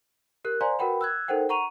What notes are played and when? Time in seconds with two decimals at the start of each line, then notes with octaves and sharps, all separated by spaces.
0.44 G4 A#4 F#6
0.61 C5 D5 F5 G#5 A#5 C6
0.79 F#4 A#4 B4 F#5 G5 B5
1.01 E6 F#6 G#6
1.28 D#4 A4 A#4 C5 F#5 G5
1.49 F#5 A#5 C#6 D#7 F7